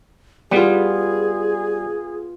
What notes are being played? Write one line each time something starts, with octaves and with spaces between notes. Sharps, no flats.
G3 B3 F4 G#4